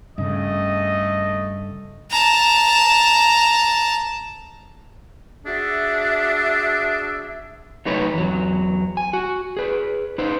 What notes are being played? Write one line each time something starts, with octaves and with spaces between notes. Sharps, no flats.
G2 C#3 A3 D#5
A5 A#5
D4 F#4 G#4 E5
F#3 A3 D#4 F#4 B4 C#5
E2 F#3
G#5
F#4
G#4 B4
D#4 B4 C5